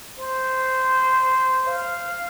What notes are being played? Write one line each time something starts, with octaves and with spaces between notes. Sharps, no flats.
C5
F5